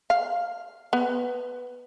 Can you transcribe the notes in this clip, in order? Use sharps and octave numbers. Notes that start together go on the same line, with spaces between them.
F5
B3